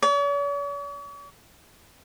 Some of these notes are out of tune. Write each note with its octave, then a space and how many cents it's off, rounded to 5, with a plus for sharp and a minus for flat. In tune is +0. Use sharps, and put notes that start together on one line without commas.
C#5 +45